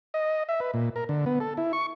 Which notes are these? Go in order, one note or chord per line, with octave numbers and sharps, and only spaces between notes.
D#5
E5
B4
A#2
A#4
D3
B3
A4
E4
C#6